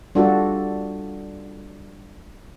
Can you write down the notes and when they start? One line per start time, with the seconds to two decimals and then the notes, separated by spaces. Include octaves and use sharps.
0.15 G3 D4 F4 F#4 A4